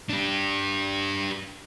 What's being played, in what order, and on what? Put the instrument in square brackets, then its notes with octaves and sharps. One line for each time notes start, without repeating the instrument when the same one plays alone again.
[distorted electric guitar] D4 G4